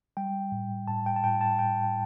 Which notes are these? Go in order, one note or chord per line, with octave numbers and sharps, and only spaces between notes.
G3 G5
A2
A2 A5
G5
A5
A2 G5
A5
A2 G5